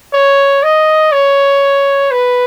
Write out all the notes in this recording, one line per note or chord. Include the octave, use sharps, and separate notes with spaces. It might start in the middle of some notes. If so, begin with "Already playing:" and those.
C#5
D#5
C#5
B4